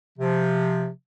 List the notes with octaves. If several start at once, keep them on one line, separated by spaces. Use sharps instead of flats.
C3 F3